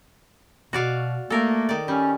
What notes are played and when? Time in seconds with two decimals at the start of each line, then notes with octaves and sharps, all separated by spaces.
0.73 B2 F#4 D5 F5
1.30 A3 A#3 A4 A#4
1.69 D#3 D5
1.88 G3 C#4